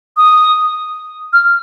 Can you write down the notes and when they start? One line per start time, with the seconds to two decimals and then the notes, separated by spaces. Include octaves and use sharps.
0.17 D#6
1.33 F6